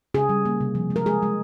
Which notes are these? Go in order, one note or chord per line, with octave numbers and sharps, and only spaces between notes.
C#3 G#4
G3
A#3
C3
F3
G#3
A#4
G#3 G#4
G#3